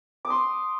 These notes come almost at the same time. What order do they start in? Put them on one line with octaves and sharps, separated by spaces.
D6 D#6 C6